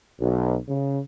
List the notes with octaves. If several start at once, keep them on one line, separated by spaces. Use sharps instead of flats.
B1
C#3